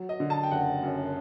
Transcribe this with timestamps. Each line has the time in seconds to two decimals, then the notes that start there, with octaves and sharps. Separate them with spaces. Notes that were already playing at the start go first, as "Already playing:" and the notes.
Already playing: F#3
0.09 D#5
0.20 D3
0.30 A5
0.43 G5
0.51 F#1 F#5
0.83 F#2